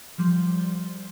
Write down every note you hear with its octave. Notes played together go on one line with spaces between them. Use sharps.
F3 G3 C6